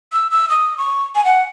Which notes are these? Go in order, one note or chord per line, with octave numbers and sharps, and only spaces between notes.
E6
E6
D#6
C#6
G#5
F#5